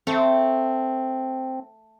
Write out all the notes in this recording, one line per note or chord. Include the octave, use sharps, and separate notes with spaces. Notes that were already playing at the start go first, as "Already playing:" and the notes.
A3 C4